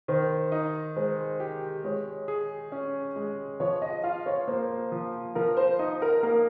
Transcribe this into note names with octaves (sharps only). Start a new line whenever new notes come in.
D#3 C5
D#4
G#3 C5
G4
G#3 C#5
G#4
C#4
G#3
F3 C#5
D#5
F4 F5
C#5
A#3 C5
F3
F3 A#4
C5
D#4
A#4
A#3 A#4